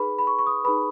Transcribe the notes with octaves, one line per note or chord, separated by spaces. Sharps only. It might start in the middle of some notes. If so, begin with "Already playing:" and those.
Already playing: D#4 G#4 B4 B5
B5
C#6
C#6
D#6
D#4 G#4 B4 B5